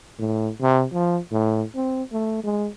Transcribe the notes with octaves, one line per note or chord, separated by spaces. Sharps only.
A2
C3
F3
A2
C4
A3
G#3